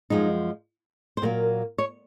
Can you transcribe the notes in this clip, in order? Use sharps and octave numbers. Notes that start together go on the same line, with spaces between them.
F#2 F3 G#3 D#4
C5
A#2 F#3 A#3 A#4
C#5